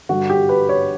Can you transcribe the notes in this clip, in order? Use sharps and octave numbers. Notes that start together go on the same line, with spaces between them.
G2 D3 F#4
G4
B4
C#5